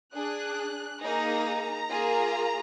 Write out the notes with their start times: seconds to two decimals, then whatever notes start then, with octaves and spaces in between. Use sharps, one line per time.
0.14 D4 G#4 F#6
1.02 A#3 D#4 G#4 A#5
1.89 A#3 F4 G#4